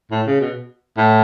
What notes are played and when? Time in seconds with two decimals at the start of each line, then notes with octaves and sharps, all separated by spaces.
0.11 A2
0.27 C#3
0.41 B2
0.98 A2